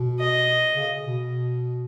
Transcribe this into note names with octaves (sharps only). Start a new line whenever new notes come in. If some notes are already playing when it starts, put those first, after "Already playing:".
Already playing: B2
D#5
C#3
B2